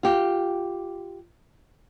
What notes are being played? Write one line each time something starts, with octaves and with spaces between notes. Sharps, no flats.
F4 G4